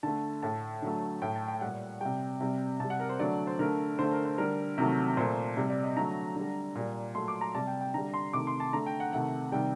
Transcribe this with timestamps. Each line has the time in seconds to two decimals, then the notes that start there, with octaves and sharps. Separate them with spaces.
0.03 D3 A3 A5
0.42 A2 A3 A5
0.82 D3 F#3 A3
1.22 A2 A3 G5
1.36 A5
1.48 G5
1.61 A#2 G3 F#5
2.01 C3 G3 G5
2.41 C3 G3
2.80 C3 A5
2.84 G3
2.90 F#5
3.00 A#4
3.09 C5
3.20 D3 F#3 A3 D5
3.47 C5
3.59 D3 A3 A#4
3.99 D3 A3 C5
4.12 A#4
4.25 C5
4.38 D3 G3 A#4
4.78 C3 D#3 F#3 A3
5.17 A#2 A3 C5
5.57 C3 G3
5.70 D5
5.83 D#5
5.96 D3 F#3 A3 A#5
6.36 D3 G3
6.75 A#2 G3
7.15 A#2 F#3 A3 C6
7.28 D6
7.41 A#5
7.54 C3 G3 A5
7.67 G5
7.81 G5
7.94 D3 G3 A#5
8.14 C6
8.33 C3 D#3 A3 D6
8.47 C6
8.60 A5
8.73 D3 A3 A#5
8.86 G5
9.00 F#5
9.13 C3 D#3 A3 F#5
9.52 C3 D#3 G3 G5